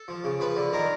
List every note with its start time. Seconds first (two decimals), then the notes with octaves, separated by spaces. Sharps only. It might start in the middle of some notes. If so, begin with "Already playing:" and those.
Already playing: A4
0.08 F3
0.24 C#3
0.40 F3 B4
0.56 D3
0.73 D#3 A#4